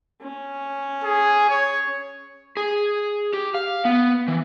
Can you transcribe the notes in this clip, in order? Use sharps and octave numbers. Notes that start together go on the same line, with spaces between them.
C#4
G#4
C#5
G#4
G4
F5
B3
E3